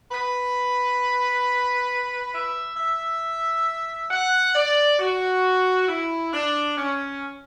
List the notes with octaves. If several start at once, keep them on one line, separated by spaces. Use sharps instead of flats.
B4
E5
E5
F#5
D5
F#4
E4
D4
C#4